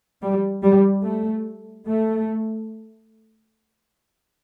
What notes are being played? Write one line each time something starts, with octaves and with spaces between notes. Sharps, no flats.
G3
G3
A3
A3